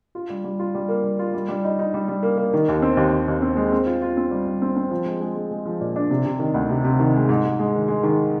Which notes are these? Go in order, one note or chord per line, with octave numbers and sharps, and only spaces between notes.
F4
G3
G3
F4
G3
A#3
G3
F4
G3
G3
D#4
D#4
G3
G3
A#3
A#3
D#3
D#2
C4
D#2
D#2
D#2
C4
G#3
C4
F4
F4
C4
G3
G3
C4
C4
F3
G#3
G#3
G#3
G#3
F3
A#2
D4
C3
C3
D#3
D2
C3
C3
D#3
G#3
G#2
G#2
G#3
D#3
G#3
D#3